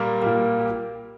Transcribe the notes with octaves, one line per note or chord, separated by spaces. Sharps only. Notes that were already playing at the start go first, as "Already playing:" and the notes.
Already playing: A#2 G3 A#3 A#4
A#2 G3 A#3
G4